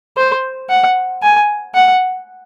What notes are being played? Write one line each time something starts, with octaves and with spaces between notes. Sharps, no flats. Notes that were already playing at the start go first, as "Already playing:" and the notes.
C5
F#5
G#5
F#5